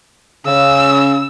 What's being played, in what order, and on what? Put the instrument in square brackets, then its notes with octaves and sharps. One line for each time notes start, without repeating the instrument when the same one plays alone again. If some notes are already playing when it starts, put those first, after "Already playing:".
[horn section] C#3 [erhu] E6